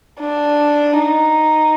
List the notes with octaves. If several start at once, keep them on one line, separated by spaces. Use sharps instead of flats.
D4
D#4